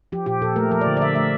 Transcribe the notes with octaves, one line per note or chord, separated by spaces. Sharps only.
F3 G4
A#2 G4
A#2 A4
A3 A#4
F3 A#4
D5
D3
D5
D3 E5
A3 E5